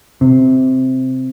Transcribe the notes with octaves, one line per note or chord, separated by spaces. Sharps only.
C3